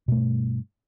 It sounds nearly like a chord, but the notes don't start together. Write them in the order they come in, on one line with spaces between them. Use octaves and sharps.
B2 A3 G2